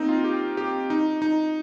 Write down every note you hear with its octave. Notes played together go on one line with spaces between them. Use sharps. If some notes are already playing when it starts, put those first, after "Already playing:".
Already playing: A#3 C4 D#4
F4
G4
G4
D#4
D#4